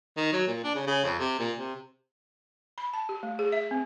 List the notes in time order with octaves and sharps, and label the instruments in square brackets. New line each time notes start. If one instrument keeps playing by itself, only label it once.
[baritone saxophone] D#3
F#3
A#2
D4
C#3
C#3
F2
C3
A#2
C3
[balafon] B5
A5
G4
A3
G#4
E5
C4